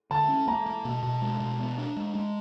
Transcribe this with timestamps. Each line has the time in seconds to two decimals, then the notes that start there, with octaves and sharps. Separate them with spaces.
0.11 D3 A5
0.29 C#4
0.47 A#3 A#5
0.66 A#3
0.85 B2
1.03 B2
1.22 G#3
1.40 B2
1.59 B3
1.78 D4
1.97 G#3
2.15 G#3